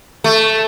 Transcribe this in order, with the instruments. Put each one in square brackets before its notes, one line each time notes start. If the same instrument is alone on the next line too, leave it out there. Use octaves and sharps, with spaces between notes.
[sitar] A3